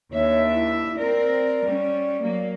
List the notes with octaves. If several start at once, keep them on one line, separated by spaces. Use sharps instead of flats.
D#2 D4 C#5 E5
E4
C4 A#4 D5
G3 C#4
F#3 A#3